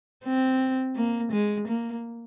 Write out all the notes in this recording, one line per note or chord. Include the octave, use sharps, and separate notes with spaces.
C4
A#3
G#3
A#3